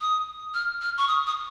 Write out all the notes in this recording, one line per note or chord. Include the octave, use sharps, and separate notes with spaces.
D#6
F6
F6
C#6
D#6
D#6